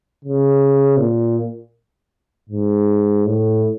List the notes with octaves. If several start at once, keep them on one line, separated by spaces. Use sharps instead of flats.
C#3
A#2
G#2
A2